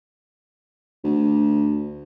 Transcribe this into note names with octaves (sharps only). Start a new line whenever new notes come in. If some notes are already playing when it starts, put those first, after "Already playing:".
D2